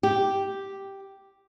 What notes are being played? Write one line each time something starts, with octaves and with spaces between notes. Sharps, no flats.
G4